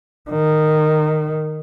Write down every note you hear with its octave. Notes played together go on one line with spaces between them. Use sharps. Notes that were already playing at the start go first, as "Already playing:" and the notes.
D#3